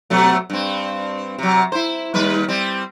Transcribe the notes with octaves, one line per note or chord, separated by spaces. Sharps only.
B2 F#3 A3
G2 C4
C3 F#3
E4 C5
D#2 G3 B4
G3 C4